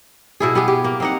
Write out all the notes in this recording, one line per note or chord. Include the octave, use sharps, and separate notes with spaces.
B2 E4 G#4
B3 G4 G#4
G4
A#3
C4 D#4 F#5